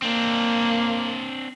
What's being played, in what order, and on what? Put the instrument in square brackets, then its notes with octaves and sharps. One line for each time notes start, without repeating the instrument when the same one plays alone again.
[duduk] A#3 [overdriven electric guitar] C4 D4